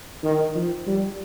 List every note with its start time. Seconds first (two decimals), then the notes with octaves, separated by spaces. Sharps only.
0.24 D#3
0.56 F3
0.87 G3